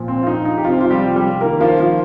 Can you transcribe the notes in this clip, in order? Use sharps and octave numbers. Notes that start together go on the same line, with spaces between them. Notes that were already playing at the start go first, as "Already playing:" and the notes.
Already playing: A#2 F3
C4
F4
D#4
D#4
G4
C3 F3 C4 F4
F4
G3 G4
G3 G4
D#3 A#3 A#4
F3 F4
F3 F4